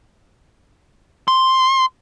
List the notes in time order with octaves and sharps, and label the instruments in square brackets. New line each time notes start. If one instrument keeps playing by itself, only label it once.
[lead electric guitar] C6